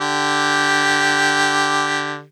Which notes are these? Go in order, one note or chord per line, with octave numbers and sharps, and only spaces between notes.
D3 G4